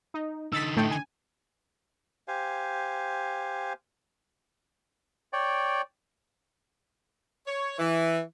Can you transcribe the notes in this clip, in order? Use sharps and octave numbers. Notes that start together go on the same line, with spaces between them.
D#4
D3 D#4 E6 A6 B6
A2 A3 G5
G#5
G4 C5 F5 G#5
C#5 D5 G5
C#5
E3